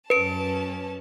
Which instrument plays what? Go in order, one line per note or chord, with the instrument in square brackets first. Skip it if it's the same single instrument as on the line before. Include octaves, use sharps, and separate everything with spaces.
[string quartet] F#2 C#4 A5 [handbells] B4 D7